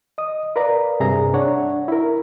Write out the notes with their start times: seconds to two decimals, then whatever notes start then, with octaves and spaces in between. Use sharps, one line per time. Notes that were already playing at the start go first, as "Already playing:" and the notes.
0.18 D#5 D#6
0.56 A#4 B4 D5 F5 A#5
1.00 G2 C3 G#4 E5 A#5
1.34 D4 C#5 F#5
1.88 E4 A#4